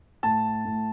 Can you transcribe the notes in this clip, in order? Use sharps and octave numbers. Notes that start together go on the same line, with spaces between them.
A2 A5
A2